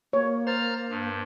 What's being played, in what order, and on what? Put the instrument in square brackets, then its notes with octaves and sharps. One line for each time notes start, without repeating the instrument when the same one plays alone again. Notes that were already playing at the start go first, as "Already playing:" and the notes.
[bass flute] A#3 [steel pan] C#5
[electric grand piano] C5 [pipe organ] A#5 F6 A6
[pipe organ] G2